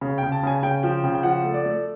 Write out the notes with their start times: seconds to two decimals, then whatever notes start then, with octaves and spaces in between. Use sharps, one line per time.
0.01 C#3
0.18 G5
0.23 C#3
0.32 A5
0.43 C#3 G#5
0.63 C#3 G5
0.83 F3 G5
1.04 C#3 G5
1.14 G5
1.23 F3 F#5
1.44 A3
1.54 D5
1.65 A3